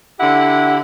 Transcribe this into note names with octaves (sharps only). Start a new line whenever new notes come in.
D3 E4 G4 F#5